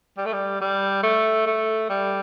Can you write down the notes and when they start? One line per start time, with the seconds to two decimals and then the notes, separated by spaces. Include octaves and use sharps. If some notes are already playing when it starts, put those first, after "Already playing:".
0.18 G3
0.26 A3
0.33 G3
0.61 G3
1.03 A3
1.47 A3
1.89 G3